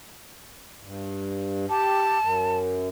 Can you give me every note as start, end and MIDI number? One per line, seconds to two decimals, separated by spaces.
0.81 1.66 43
1.69 2.18 67
1.69 2.58 81
2.21 2.89 42